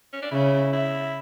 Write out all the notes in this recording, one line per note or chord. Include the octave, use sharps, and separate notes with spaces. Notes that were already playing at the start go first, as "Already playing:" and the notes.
C#4
D4
C#3 E4
E4